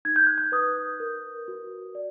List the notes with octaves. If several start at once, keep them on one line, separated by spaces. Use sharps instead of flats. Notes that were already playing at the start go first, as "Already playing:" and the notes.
D#4 G#6
G6
F#6
G6
B4 D#6
A#4
F#4
D5